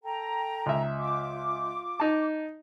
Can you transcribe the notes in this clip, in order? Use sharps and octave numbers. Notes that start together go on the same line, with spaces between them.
A4 G5 A#5
C#2 E5
F4 D6
D#4 A5